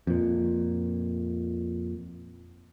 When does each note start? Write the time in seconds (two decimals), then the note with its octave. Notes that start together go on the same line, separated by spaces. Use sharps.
0.07 F2 A#2